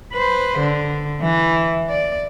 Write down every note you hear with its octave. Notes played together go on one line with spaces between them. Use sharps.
B4 C5
D3
E3
D5